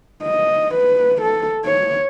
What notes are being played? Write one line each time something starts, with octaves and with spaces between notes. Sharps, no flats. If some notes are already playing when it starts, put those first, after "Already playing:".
D#5
B4
A4
C#5